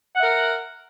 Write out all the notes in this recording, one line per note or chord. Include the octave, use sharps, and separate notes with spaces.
A#4 E5 F#5